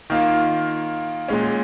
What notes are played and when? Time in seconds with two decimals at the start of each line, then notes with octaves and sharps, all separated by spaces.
0.10 D#3 A#3 F4
1.28 A#2 G#3 C#4